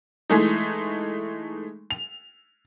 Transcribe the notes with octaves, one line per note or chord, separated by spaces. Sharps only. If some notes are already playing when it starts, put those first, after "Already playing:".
E3 G#3 A3 D#4
F7